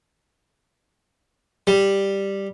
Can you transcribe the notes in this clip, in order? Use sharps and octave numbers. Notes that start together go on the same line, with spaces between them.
G3